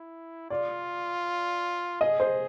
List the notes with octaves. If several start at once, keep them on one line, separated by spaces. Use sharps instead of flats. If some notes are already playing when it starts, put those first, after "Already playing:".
Already playing: E4
F4 D5
G#4 D#5
C5